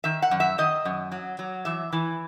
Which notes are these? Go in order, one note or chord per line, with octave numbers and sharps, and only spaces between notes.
D#3 E5
F#5
F#2
E5
D#3 D#5
F#2
F#3
F#3
E3 E5
E3